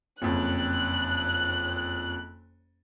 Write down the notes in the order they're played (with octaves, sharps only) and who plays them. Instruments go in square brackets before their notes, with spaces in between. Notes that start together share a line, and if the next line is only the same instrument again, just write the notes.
[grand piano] F#1 F2 C#4 [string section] F#6